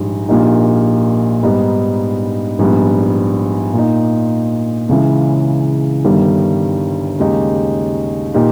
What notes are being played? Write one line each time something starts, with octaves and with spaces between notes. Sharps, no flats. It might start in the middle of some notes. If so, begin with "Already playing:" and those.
Already playing: A#1 G#2 G3
A#1 A#2 A#3 D#4 G4
G#2 G3 B3 D#4
A#1 G#2 G3 B3
A#2 A#3 D#4
C#2 C#3 E3 G#3
G1 G2 D#3 G3
D#2 C#3 G#3 D#4 G4
A#2 A#3 D#4 G4